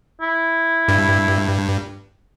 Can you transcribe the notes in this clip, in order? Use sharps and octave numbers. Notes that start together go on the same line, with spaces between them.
E4
G2